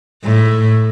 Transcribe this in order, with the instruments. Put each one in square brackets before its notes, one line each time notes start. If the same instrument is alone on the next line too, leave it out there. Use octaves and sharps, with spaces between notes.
[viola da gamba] A2